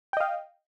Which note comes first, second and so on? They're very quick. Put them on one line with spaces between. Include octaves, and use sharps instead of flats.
G5 D#5 F5